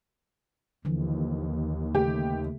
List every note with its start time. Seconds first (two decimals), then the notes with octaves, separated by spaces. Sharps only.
0.85 D#2 D3 E3 F3
1.95 C#3 A3 G4